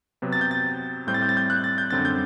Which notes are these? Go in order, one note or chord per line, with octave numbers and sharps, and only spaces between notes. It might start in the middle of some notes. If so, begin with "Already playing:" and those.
C3 F#3 B3
A6
G6
A6
A2 G3 C4 G6
A6
G6
A6
G6
F#6
A6
G6
F#2 D3 G3 C4 A6
G6